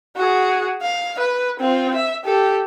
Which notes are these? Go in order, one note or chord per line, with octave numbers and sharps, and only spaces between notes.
F#4 G#4
F5
B4
C4 F4
E5
G4 A4